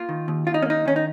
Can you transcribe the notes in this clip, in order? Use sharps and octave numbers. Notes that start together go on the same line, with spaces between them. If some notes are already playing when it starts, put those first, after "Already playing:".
Already playing: A#3 F4
D#3
D#2
D#2 F4
D#4
C#4
A#3 D#4
D#3 C#4
D#4